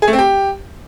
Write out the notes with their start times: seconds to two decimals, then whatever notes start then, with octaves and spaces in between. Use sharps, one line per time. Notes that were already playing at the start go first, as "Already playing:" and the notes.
0.02 G#4
0.08 A3
0.13 C4
0.18 G4